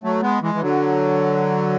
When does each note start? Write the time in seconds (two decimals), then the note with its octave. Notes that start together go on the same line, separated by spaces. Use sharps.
0.03 F#3 A3
0.22 G#3 B3
0.42 E3 G#3
0.55 E3
0.62 D3 F#3